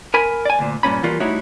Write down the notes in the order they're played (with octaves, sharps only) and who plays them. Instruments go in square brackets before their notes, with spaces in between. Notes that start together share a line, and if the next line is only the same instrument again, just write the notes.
[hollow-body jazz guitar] A#4 G#5 B5
D5 G#5
D2 A#2
G2 A#2 C#4 B5
E3 G3 A#3 F4 F#4
G3 A3 D#4 E4 F#4 C#5